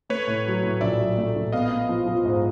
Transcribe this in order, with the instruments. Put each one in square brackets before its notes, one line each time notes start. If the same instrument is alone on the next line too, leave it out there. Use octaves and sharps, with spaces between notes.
[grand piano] A3 [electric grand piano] B4 C#5
[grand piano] A2
F#3
A2
[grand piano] A#1 [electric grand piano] D5 E5
[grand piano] F#3
A3
A#1
[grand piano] B3 [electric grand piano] D#5 F5
[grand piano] B3
F3
F3
G#2